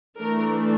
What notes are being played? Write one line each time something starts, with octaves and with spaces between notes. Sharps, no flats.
E3 A3 D4 A#4